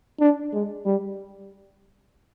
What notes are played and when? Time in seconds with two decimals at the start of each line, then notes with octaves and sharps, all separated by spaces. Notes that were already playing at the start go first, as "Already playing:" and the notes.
0.20 D4
0.53 G#3
0.86 G3